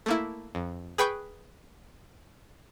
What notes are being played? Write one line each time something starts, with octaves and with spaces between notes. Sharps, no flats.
A3 A#3 E4
F2
G#4 B4 G5 B5 C#6 G6